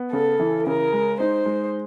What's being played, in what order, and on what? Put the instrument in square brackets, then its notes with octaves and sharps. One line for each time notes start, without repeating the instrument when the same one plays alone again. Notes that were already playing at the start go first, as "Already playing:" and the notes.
Already playing: [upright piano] B3
[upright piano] C#3 [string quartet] A4
[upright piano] E3
[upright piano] C#3 [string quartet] A#4
[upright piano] G#3
[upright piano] D#4 [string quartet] C5
[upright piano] G#3